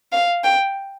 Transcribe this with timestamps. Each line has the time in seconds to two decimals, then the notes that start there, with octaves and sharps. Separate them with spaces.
0.12 F5
0.44 G5